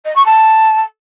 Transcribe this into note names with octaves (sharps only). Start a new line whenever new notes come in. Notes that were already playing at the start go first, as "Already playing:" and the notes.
D#5
C#6
A5